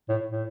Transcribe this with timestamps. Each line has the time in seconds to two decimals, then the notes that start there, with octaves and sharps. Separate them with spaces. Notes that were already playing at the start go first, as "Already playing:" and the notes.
0.09 A2
0.31 A2